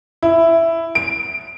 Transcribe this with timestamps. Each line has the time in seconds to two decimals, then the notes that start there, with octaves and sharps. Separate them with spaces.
0.23 E4
0.95 D7